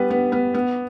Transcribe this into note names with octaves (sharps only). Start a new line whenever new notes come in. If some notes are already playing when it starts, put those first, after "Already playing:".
Already playing: G3 B3 B4
B3
B3
B3